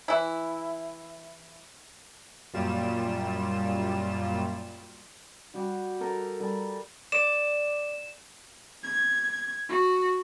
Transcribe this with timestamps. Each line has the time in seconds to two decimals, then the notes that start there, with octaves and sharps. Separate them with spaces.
0.08 E3 E4
2.53 F#2 A#2 G3 F4 E7
5.54 G3 F#4 G4
6.01 G4 A4 A#4
6.40 G3 A4
7.12 D5 E7
8.84 G#6
9.69 F#4